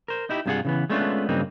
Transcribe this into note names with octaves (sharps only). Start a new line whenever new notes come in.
A#4 C5
D#4 E4 G4
G2 C3 C4 F4 G#4 F#5
C#3 E3 B3
G#3 A3 B3 C#4 D4 F4
G2 C#3 F#3 A#3 C4 D#4